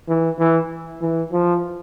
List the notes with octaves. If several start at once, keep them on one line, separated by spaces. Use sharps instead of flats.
E3
E3
E3
F3